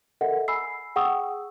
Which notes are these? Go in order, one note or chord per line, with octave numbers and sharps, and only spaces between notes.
A4 A#4 D#5 E5 F#5
G#5 B5 E6 C7
G#4 F#5 G5 C#6 D#6 E6